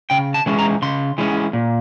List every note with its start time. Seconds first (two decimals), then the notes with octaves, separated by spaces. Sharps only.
0.10 C#3 G5
0.34 A5
0.46 E3 G#3 C#4
0.59 A#5
0.82 C#3 C6
1.18 E3 G#3 C#4
1.53 A#2